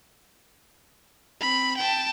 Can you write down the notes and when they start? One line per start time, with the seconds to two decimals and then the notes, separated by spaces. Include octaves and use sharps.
1.40 C4 B5
1.77 G5 A5